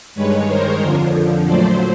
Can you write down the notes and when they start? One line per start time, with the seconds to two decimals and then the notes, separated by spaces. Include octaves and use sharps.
0.15 G2 D#3 G#3 B4 C#5
0.47 A#4 C5
0.80 F2 D3 F3
1.45 A#2 F#3 A3 C5 D5